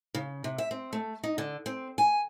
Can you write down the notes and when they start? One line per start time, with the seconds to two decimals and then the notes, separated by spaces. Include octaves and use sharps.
0.15 C#3
0.44 C3
0.58 E5
0.71 C4
0.93 A3
1.24 D#4
1.38 D3
1.66 C4
1.98 G#5